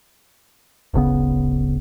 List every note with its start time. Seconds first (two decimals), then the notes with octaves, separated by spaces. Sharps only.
0.94 D1 G1 C#3 B3